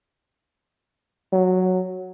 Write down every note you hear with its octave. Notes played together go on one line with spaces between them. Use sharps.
F#3